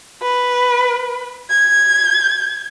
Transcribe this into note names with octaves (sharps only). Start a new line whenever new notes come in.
B4
G#6